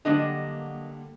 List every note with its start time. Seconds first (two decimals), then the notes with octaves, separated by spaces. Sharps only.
0.05 D3 F#3 G3 A#3 D4 D#5